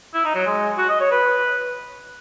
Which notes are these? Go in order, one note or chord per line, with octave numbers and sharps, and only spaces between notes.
E4
D#4
F#3
G#3
F#4
D#5
C#5
B4